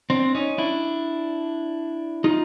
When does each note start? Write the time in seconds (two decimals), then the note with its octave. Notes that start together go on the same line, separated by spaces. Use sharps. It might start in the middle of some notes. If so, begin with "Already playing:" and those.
0.10 C4 D4
0.35 C#4 D#4
0.58 D4 E4
2.24 D#4 F4